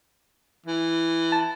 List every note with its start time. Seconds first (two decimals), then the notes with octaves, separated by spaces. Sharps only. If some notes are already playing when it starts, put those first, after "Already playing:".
0.66 E3
1.32 A5